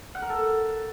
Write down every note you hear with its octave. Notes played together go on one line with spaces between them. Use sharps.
F#5
A#4
A4